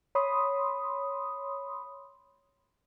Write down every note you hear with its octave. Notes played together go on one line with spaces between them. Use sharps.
C#5 B5 C6 D#6